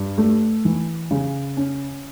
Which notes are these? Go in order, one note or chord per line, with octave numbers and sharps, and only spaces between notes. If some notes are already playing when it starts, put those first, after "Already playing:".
Already playing: G2
A3
E3
C#3
C#4